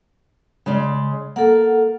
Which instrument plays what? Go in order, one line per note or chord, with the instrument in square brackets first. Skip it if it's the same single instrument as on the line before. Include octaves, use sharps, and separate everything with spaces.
[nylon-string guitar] C#3 G#3 D5
[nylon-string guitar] A#3 [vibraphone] A4 F#5